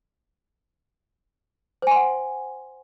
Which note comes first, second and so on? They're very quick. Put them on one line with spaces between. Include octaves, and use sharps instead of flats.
C5 G#5 C6 F#5